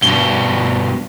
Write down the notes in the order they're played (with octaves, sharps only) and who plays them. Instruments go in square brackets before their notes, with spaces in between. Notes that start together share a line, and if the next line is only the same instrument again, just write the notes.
[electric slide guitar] G2 B2 [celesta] G7